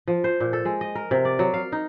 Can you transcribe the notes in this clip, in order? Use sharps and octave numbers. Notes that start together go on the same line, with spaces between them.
F3
C5
A#2
A4
G#3
D#5
A#4
C3
D5
F#3
F5
D#4